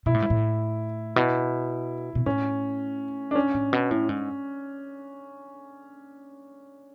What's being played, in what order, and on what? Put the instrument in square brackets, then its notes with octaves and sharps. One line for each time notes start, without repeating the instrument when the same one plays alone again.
[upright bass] B2 [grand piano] E4
[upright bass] A2
G#2
A2
[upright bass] B2 [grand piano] E4
[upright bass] B2
[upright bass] A2 [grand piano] C#4
[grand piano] D4
C#4
[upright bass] A2
B2
A2
G#2